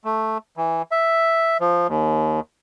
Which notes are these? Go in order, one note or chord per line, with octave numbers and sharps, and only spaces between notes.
A3
E3
E5
F3
D#2